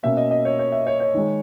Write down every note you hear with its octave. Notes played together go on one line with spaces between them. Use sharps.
B2 A#3 C#4 E5
D#5
D#5
C#5
C#5
E5
C#5
C#5
D#3 G#3 D#4